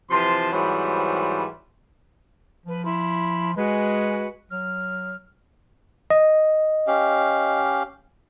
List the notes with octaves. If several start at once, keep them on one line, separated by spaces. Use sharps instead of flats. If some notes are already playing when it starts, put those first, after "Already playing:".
C3 E3 F3 A5 C6
G#2 E3 F#3 G3 C4 B5
F3 B4
E4 B5 C6
G#3 F#4 G#4 B4
F#3 F6
D#5
C#4 G4 F5